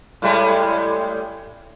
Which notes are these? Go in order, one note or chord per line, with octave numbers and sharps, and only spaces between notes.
A2 G3 G#3